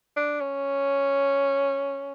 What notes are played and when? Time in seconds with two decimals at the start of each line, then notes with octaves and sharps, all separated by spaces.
0.16 D4
0.41 C#4